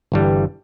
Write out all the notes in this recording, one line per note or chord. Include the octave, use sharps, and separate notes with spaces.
G1 G2 E3 G3